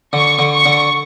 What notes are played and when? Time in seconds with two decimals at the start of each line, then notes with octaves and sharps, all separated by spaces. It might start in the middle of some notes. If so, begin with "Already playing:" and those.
0.13 D3 C#6
0.39 D3
0.53 C#6
0.66 D3